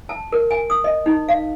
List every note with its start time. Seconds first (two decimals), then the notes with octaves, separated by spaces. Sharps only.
0.09 A5
0.32 A#4
0.51 G#5
0.70 D#6
0.84 D#5
1.06 D#4
1.29 F5